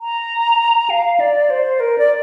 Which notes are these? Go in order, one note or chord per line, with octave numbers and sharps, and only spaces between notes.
A#5
F5
D5
C5
A#4
D5